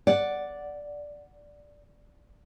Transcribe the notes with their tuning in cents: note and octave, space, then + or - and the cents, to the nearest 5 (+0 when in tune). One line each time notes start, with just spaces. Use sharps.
D5 +0 F#5 +0